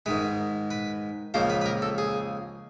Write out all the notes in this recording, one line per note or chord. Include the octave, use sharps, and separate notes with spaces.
G#2 D#3 G#3 B4
B4
C#2 C#3 F3 A#3 C5
B4
B4
A#4
A4
G#4